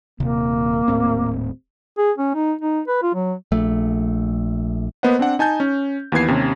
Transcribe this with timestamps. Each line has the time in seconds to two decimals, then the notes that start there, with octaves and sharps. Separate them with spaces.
0.20 D#1 C3 A#3
0.88 D#1 A2 C4
1.98 G#4
2.18 C#4
2.35 D#4
2.61 D#4
2.88 B4
3.02 F4
3.15 F#3
3.52 A#1 A3
5.03 A#3 B3 B4 C5 D#5 F#5
5.19 C4 D4 F#5
5.39 D#4 G#5 A5 G6
5.60 C#4
6.12 D#2 E3 B3 G#6 C7
6.28 D#2 C3 C#4